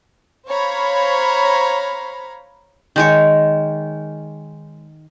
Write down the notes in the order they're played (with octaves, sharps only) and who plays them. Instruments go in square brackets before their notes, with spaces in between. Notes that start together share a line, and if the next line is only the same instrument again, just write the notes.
[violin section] C5 C#5 F5 A#5 B5
[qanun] D#3 G#3 C#5